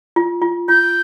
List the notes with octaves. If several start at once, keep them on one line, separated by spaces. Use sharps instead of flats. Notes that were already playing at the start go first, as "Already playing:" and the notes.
F4
F4
F4 G6